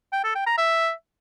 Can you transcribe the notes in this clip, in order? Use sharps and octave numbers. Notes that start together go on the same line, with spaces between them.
G5
A4
G5
A#5
E5